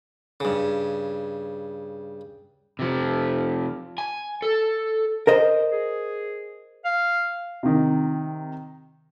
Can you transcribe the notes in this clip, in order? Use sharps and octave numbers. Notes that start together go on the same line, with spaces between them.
G2 C#3
C3 F3
G#5
A4
A#4 C5 D#5
G#4
F5
C3 D#3